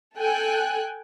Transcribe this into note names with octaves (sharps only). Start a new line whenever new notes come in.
A4 G5 G#5 F#6